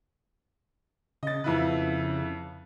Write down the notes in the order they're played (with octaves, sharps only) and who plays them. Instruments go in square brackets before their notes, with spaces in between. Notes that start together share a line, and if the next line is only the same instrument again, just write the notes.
[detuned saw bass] C#3 [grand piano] D#5 A6
[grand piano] F2 E4 B4 [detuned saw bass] C#3